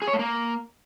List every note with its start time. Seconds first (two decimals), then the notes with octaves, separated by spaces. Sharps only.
0.02 G#4
0.07 C#5
0.13 A3
0.19 A#3